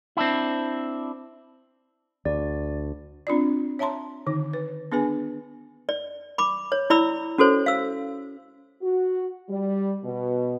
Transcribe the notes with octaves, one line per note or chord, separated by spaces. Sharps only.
C4 D4 E4
D2 D5
C4 D4 F4 D5
C#5 E5 A5 A#5 C6
D3 D#3 D#4
B4
B3 D4 G#4 B4 G#5
D5
B5 D6
C#5
E4 D5 B5 E6
C#4 F#4 A4 C5 C#5
F5 E6
F#4
G3
B2